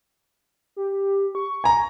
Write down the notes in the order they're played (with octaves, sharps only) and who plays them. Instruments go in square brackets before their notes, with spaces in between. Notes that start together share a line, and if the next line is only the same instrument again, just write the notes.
[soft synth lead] G4
C#6
[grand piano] G#5 A#5